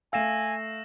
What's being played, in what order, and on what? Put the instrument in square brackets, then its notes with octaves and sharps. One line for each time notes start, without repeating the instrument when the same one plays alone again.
[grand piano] A3 F5 [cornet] G#5 [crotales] E6 A#6 E7